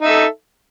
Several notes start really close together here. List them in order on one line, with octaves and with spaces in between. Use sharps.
D#4 E5 A4